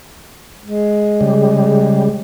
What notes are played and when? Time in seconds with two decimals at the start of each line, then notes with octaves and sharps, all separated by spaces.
0.63 G#3
1.21 C#3 G3